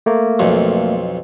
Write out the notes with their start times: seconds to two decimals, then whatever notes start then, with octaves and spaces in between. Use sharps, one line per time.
0.06 A3 A#3
0.39 B1 F2